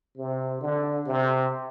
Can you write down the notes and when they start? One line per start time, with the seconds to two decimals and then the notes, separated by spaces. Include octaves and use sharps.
0.17 C3
0.61 D3
1.06 C3